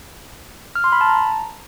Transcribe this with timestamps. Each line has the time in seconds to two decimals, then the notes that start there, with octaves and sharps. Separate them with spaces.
0.75 F6
0.84 C6
0.92 B5
1.01 A5
1.09 A#5